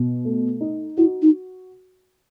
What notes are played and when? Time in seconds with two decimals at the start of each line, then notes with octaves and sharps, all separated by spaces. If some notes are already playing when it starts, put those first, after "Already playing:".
Already playing: B2
0.25 A3
0.61 D#4
0.97 E4 F#4
1.22 D#4